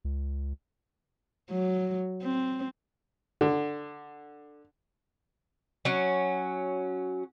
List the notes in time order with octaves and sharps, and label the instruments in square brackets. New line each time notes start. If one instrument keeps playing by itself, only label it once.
[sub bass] C#2
[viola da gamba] F#3
C4
[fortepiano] D3
[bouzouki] F#3 C#4